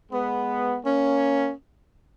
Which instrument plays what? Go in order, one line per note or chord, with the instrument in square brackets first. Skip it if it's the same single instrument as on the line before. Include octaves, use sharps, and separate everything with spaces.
[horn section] G#3 B3
A#3 C#4